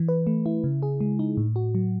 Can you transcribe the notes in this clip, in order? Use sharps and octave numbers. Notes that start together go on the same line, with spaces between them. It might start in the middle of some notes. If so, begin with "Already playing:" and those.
Already playing: E3
B4
A3
E4
C#3
G#4
G#3
D#4
A2
F#4
F#3